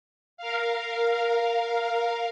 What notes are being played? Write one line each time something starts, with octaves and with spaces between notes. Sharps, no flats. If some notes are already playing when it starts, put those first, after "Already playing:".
A#4 F5